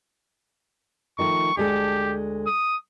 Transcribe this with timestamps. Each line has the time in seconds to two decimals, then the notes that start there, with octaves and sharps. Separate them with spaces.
1.19 D#3 F3 A3 C#6
1.57 D2 G#3 G4 A4
2.47 D#6